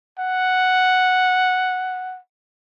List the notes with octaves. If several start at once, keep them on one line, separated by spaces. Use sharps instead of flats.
F#5